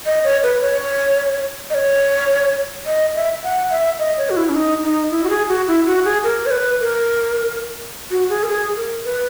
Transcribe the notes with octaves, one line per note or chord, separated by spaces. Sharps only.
D#5
C#5
B4
C#5
D#5
C#5
D#5
E5
F#5
E5
D#5
C#5
F#4
E4
C#4
D#4
D#4
E4
F#4
G#4
F#4
E4
F#4
G#4
A#4
C#5
B4
A#4
F#4
G#4
A#4
G#4
A#4
B4